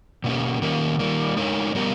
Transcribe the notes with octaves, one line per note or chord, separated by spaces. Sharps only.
B2 A#3 C#4 G4
D#3 A#3 C#4 G4 A#4
D#3 G3 A#3
G#3 D#4 A#4 C#5
G3 B3 G4 A#4